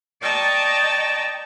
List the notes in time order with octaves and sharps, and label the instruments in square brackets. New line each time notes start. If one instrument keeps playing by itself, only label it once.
[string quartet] D5 D#5 G5 A5 A#5 C#6